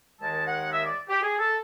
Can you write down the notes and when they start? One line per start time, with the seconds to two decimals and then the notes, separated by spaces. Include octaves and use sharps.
0.20 D#2 D#3 G#3 A5
0.46 F#5
0.71 E5
0.84 D5
1.09 G4
1.22 G#4
1.39 A4